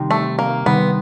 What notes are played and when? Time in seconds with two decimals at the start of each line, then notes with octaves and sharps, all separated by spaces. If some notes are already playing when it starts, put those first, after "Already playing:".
Already playing: C3 D#3 G3 C4 D#4
0.11 A3
0.39 A#3
0.66 C3 D#3 G3 B3 C4 D#4